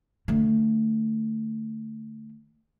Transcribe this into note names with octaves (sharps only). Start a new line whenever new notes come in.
D3 A3